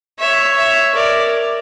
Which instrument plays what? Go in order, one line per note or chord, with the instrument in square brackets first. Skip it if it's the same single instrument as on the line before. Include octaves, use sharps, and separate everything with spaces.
[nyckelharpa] C#5 [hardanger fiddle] E5
[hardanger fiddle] E5
[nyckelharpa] A#4 [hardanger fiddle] D5